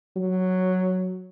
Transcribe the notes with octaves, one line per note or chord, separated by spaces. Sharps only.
F#3